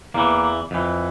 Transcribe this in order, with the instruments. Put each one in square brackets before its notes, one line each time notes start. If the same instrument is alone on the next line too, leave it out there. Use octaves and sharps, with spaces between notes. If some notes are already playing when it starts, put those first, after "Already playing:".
[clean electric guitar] E2 E3 A#3
F2 E3